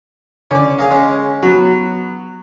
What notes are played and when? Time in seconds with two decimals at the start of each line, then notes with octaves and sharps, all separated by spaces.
0.51 D3 C#4 D5
0.79 A#3 G#4 F5
0.91 G#3 C#4
1.43 F#3 B3 F#4